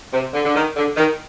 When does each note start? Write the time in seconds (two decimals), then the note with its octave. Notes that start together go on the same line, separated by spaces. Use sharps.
0.14 C3
0.34 D3
0.45 D3
0.56 D#3
0.76 D3
0.97 D#3